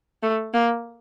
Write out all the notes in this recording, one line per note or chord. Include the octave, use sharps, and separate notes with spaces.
A3
A#3